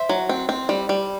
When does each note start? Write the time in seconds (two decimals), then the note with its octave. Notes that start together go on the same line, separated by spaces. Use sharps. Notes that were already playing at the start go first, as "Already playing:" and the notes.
Already playing: C5 E5
0.09 F#3
0.29 C4
0.49 C4
0.69 G3
0.89 G3